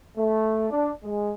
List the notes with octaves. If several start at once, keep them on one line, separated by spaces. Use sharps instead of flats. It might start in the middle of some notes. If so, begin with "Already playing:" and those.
A3
D4
G#3